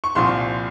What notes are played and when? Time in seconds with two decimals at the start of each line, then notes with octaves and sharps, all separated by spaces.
0.04 C#6
0.15 C2 A#2 F3 C6